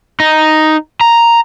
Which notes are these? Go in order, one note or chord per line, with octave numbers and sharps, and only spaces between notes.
D#4
A#5